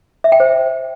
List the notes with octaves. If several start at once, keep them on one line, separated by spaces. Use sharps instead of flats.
E5
G5
C5